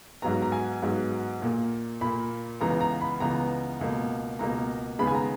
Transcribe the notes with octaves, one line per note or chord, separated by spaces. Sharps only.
G#2 F#3 B3 A#5
A#5
G#5
G#2 F#3 B3
A#2 A#3
A#2 A#3 B5
C#2 C#3 E3 B3 A#5
A#5
B5
C#2 C#3 E3 B3 A#5
C#2 B2 A#3
C#2 B2 A#3 A#5
D#2 C#3 G#3 B3 B5
G#5
A#5